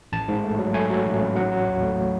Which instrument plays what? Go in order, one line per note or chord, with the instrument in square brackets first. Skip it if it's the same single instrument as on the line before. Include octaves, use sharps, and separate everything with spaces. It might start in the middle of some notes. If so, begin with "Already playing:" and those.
[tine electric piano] A1 A5
G#2
A3
F#3
A3 G#5
F#3
A1
A1
F#3 F#5
F#3
D#2
A3